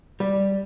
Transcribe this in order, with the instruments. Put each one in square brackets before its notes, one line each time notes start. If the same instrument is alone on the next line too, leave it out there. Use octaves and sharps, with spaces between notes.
[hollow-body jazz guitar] G3